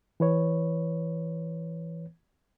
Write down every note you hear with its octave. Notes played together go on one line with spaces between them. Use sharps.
E3 B4 C#5